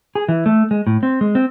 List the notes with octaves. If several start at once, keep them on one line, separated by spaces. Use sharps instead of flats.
G#4
E3
A3
G#3
A2
C4
G#3
C4